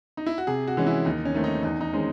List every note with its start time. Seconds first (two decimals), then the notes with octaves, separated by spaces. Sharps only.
0.17 D#4
0.26 E4
0.38 F#4
0.47 C3 G#4
0.68 F#4
0.77 E3 G#3 C#4
0.86 E4
1.05 D#2 D#4
1.25 C#4
1.34 D#3 A3 C4
1.44 D#4
1.63 E2 D#4
1.81 D#4
1.93 D#3 G#3 C4 C#4